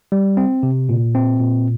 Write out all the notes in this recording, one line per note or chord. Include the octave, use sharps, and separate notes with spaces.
G3
C4
C3
A#2
C4
A#2